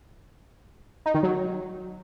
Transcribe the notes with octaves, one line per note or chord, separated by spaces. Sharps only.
D#4
D#3
F#3